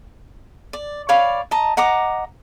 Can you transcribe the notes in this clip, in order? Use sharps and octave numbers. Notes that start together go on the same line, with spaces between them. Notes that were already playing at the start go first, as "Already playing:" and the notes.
D5
C#5 D5 F5 B5
D#5 A5 A#5
D#5 F#5 A#5 D6